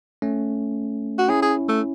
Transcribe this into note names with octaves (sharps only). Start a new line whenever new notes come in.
A3 C#4
F#4
C#4 E4 G#4
G#4
A3